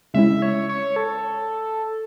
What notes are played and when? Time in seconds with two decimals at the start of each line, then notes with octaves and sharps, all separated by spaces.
0.14 C#3 G#3 C#4 E4 E5
0.42 C#5
0.69 C#5
0.96 A4